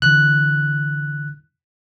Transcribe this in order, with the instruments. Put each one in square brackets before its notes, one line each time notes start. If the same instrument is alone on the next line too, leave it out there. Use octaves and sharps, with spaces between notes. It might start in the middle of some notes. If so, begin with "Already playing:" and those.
[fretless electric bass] D3 E3 [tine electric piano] F#6